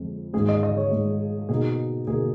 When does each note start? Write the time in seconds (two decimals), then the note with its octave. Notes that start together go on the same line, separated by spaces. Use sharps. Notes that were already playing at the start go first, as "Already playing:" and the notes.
Already playing: F2 F3 G#3
0.33 G#2 D#3 G#3 G#4
0.49 D#5
0.63 D#5
0.77 C#5
0.92 G#2 D#3 G#3
1.49 B2 A#3 D#4 G#4
2.07 B2 A#3 D#4 G#4